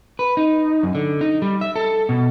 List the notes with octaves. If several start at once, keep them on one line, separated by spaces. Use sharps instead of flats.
B4
D#4
F#2
D3
D#4
G3
E5
A4
B2